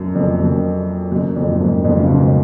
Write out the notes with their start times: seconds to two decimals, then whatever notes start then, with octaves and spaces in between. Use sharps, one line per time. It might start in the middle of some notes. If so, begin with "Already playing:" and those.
Already playing: F#2
0.15 F2
0.40 F#2
1.12 F#2
1.36 F2
1.51 G#2
1.60 F#2
1.84 F2 G#2
1.98 C#3
2.08 G#2 B2